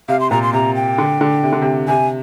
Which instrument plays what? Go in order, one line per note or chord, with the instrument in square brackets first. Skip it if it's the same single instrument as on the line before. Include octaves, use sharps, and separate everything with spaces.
[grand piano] C3 [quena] F5
[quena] C6
[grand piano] A#2 [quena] A#5
[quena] C6
[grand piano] C3 [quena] A#5
[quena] G5
[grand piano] D3
D3
C3
D3
C3
[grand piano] C3 [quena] G#5